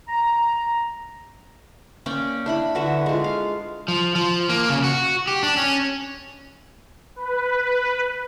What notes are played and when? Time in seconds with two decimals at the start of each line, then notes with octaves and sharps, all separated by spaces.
0.08 A#5
2.06 A#3 C#4 D5 G5
2.46 D4 E4 B5
2.75 D3 F#4 B4 E5
3.06 G#3 F4
3.24 F5
3.88 F3
4.16 F3
4.49 A#3
4.69 C#3
4.84 F#4
5.27 G4
5.43 D4
5.57 C#4
7.16 B4